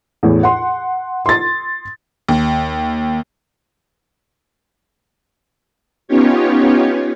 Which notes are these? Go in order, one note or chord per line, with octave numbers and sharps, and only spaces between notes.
E2 A2
F#5 C6
C6 A6
D#2
B3 C#4 D#4 F4 G4 C#5